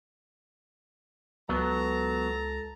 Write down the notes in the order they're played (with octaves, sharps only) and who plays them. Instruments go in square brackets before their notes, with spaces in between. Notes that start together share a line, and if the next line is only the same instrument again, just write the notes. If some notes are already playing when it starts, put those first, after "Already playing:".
[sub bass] C#2 [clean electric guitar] F#3 B3 [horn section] A4 A5 A#5